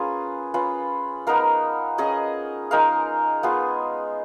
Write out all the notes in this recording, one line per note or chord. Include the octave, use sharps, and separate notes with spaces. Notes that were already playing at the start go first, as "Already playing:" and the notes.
Already playing: A#3 C#4 F4 G#4 B4
C#4 F4 B4
B3 D#4 A#4 F5
C#4 G#4 D#5
G#3 D#4 A#4 F5
B3 F4 G#4